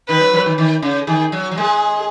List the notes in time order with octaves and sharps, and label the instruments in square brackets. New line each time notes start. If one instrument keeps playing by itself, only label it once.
[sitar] D#3 [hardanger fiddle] B4
[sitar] F#3
F#3
D#3
D#3
C#3
[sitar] D#3 [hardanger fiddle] G#4
[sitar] F#3
F#3
[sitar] G#3 [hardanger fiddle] G#4